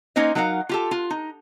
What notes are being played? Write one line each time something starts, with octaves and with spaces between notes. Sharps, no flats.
A#3 C#4 D#4 C5 D#5
F#3 D#4 A#4 F5 F#5
F4 G4 A4
F4
D#4